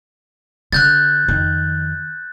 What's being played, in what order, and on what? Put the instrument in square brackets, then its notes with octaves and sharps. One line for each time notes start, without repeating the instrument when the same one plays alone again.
[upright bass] D3 [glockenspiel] F#6 G6 A6
[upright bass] F2 D#3